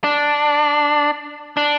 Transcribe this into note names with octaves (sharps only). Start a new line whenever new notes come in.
D4
D4